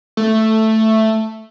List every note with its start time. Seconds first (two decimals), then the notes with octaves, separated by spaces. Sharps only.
0.17 A3